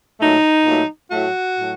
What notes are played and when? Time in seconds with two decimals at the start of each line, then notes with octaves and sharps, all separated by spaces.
0.20 A#2 F#3 A3 D#4
0.65 A#2 F#3 A3
1.11 A2 F#3 A3 F#4
1.58 A2 F#3 A3